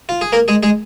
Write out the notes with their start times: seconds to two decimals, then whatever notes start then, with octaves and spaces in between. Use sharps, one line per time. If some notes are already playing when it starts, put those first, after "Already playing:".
0.09 F4
0.21 G#4
0.32 A#3 A#4
0.48 G#3 G#4
0.63 G#3 G#4